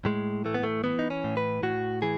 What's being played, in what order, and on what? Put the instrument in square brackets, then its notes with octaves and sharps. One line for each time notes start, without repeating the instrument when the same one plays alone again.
[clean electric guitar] A2 G#3
E3 A3
B3
A3
E3 B3
D#4
C#4
A2
B4
A2 F#4
E3 G#4